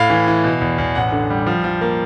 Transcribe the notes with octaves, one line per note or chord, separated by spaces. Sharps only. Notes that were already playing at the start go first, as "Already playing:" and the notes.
Already playing: A2 F5
E3
E3
B2
E2
E2
A1 F#5
D3
G3
F3
F3
A#3